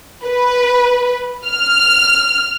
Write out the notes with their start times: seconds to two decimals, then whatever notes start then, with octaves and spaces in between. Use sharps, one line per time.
0.25 B4
1.47 F6